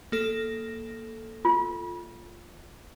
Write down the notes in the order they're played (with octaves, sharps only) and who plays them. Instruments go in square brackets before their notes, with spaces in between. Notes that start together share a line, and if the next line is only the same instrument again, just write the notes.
[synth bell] A#3 A4 A#6
[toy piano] F4